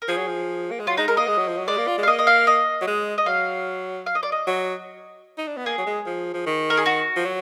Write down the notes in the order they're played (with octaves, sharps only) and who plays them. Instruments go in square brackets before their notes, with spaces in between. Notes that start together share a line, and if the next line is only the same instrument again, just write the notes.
[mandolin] A#4
[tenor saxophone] F3 [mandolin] G#4
[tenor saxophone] F#3
F3
A#3
G#3
[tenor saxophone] F#3 [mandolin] F4
[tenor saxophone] G#3 [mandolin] D#4
[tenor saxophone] G#3 [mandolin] A#4
[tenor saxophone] A#3 [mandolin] D#5
[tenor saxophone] G#3
F#3
F3
F#3
[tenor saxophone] G#3 [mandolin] D5
[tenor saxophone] A#3
F4
G#3
[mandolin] F5
[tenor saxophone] A#3 [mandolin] D#5
[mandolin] D#5
F5
D#5
[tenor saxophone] F#3
G#3
[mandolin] D#5
[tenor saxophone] F#3 [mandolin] F5
[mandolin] F5
D#5
D5
D#5
[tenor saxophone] F#3
D#4
D4
B3
[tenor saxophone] A#3 [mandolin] G#4
[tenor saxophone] F#3
G#3
F3
F3
D#3
[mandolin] A#4
G#4
F#4
[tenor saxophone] F3
F#3